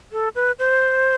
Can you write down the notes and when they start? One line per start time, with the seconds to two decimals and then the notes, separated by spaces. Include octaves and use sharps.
0.12 A4
0.35 B4
0.59 C5